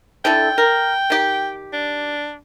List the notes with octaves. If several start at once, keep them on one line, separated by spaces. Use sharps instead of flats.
D3 E4 A4 G5
A#4
D#3 G4
D4